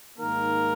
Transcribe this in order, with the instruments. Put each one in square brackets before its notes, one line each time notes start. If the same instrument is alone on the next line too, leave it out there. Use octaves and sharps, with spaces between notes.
[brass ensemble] G#2 D#3 A#3 A#4